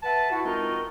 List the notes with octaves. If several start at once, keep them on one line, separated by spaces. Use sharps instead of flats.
B4 E5 F#5 A5
E4 F#4
G#3 C4 D#4 F4 F#4 A#4